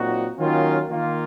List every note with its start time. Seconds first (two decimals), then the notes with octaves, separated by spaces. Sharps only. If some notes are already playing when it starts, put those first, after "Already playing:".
Already playing: A#2 F#3 C4 D#4 F#4
0.38 D#3 F#3 A#3 C#4 F4
0.89 D#3 A#3 F4